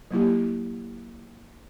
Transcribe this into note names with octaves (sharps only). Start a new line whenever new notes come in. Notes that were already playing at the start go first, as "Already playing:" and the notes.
F#3 A#3 E4 G4